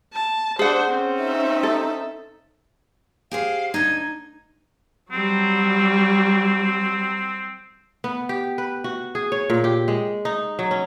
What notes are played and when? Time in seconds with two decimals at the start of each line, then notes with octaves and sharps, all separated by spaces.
0.13 A5
0.59 D4 G#4 C5 F#5
0.91 C4 C#4
1.21 D#4 E5
1.63 A4
3.31 G4 G#4 C5 F5
3.74 D2 D#4 G#6
5.12 F#3 G3 C4
8.04 B3
8.29 G4
8.58 B4
8.84 F#4
9.15 G#4
9.32 C#5
9.50 A#2
9.64 G4
9.88 G#3
10.25 D#4
10.59 F#3
10.71 C#4